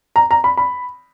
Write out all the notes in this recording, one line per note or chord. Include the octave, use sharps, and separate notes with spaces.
A#5
A#5
B5
B5